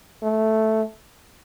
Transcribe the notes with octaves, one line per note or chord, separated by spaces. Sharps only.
A3